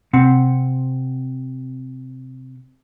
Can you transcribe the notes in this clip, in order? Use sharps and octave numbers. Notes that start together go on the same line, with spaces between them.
C3 C4 F#5